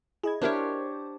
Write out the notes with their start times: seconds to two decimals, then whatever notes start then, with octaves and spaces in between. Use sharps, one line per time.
0.23 E4 G#4 D#5 G#6
0.42 D4 E4 G4 A#4 C5 C#5 E5